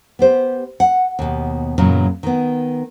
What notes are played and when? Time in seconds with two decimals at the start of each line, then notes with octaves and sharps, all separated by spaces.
0.19 B3 G4 C5
0.80 F#5
1.19 D#2 B2
1.78 F#2 A#2 C#3 E3 F#3
2.23 D#3 B3